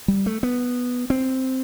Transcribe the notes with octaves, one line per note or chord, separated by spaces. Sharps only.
G3
A3
B3
C4